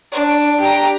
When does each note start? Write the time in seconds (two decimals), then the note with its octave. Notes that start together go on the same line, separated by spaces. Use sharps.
0.11 D4
0.60 G4 A#5